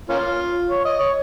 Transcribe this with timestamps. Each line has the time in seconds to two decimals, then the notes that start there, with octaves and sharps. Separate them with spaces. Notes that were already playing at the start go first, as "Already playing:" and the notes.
0.09 A#3 C#4 F4
0.70 C#5
0.85 D#5
1.00 C#5